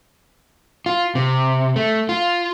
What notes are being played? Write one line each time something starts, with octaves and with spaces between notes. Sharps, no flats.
F4
C3
A3
F4